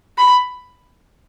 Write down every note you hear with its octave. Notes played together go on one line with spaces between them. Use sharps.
B5